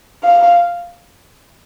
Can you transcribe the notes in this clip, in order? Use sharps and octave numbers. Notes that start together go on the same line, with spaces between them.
F5